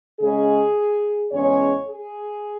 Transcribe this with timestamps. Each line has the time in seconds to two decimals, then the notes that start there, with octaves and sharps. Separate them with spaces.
0.20 C#3 G#3 C#4 G#4
1.31 E2 C#3 G#3 C#4 C#5
1.87 G#4